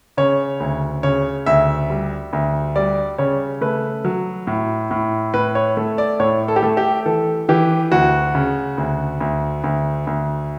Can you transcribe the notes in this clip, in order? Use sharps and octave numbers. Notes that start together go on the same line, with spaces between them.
C#3 C#5
D2
C#3 C#5
D2 E5
G3
D2
G3 D5
C#3 C#5
A3 B4
F#3
A2
A2
A2 B4
C#5
A3
D5
A2 C#5
A4
G4
A3 A4
G4
E3 A4
E3 G4
D2 F#4
C#3
D2
D2
D2
D2